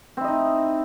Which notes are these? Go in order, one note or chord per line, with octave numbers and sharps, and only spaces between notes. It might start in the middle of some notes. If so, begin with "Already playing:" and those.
C4 D#4 E4 D#5